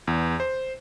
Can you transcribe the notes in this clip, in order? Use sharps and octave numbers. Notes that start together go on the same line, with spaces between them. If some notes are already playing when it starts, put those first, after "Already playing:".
E2
C5